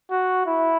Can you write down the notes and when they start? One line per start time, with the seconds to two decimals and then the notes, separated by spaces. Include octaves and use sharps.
0.11 F#4
0.46 E4